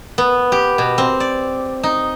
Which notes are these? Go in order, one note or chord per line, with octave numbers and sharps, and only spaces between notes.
B3
G4
B2
C4
D5
D#4